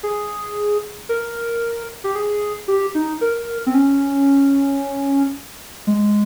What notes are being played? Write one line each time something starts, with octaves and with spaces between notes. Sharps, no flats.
G#4
A#4
G4
G#4
G4
D#4
A#4
C4
C#4
G#3